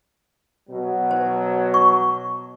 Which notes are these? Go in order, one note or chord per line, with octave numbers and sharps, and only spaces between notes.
B2 F#3
C5
C#6